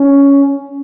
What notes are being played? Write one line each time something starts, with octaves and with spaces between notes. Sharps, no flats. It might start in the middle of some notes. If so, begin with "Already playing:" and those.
Already playing: C#4